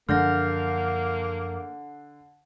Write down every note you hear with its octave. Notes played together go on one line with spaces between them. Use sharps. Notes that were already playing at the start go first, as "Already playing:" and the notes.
F#2 D3 F3 A#3 F6 G6 A#6